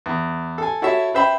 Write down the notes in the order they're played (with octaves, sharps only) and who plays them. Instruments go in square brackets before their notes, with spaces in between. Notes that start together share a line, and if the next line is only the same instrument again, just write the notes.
[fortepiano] E2
A4 G#5
E4 F#4 A4 C#5 E5
B4 C5 E5 G5 B5